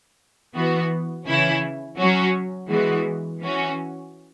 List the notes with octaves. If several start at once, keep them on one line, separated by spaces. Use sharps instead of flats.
E3 B3 F#4
C#3 E3 C#4 E4
F#3 C#4 F#4
E3 G#3 B3 F#4
E3 C#4 F#4